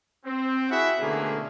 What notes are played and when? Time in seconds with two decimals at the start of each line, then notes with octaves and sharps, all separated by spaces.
0.25 C4
0.70 E4 F#4 G#4 E5 F#5
1.00 B2 D3 A3 A#3 C#4 G#4